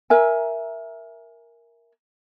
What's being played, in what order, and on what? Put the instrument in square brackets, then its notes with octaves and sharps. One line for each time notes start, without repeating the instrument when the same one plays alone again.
[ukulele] A#4 E5 G#5